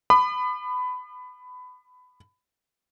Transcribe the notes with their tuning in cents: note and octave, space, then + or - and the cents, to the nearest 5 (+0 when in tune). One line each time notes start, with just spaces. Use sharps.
B5 +20 D#6 -45